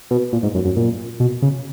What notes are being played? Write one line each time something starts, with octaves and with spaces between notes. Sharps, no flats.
B2
A#2
G#2
F#2
F#2
A#2
B2
C#3